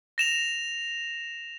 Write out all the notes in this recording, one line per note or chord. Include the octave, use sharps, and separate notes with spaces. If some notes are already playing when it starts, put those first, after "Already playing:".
A#6 E7 F7